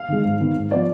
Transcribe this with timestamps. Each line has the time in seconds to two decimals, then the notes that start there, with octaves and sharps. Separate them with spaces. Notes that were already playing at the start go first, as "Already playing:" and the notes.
Already playing: F5
0.09 D#3 G#3
0.24 G#2
0.40 D#3 B3 D#4
0.56 G#2
0.71 F3 B3 F4 D5